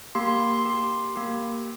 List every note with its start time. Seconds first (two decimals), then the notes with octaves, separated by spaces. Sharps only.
0.15 A#3 G4 C6
0.28 C6
0.39 C6
0.52 C6
0.65 A#3 G4
1.16 A#3 G4